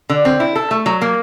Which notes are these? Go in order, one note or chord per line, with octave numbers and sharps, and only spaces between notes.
D3
C4
E4
A4
A3
F#3
A#3